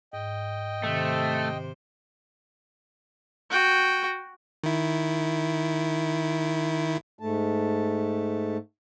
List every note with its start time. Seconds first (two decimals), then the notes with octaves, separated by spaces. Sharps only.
0.13 G#2 D#5 G5
0.83 C3 D#3 A3 C5
3.50 F#4 G5
4.64 D#3 E4
7.19 G#2 A3 A5